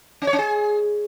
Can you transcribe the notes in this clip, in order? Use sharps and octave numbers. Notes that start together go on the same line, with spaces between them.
C#4
C#5
C#4
G#4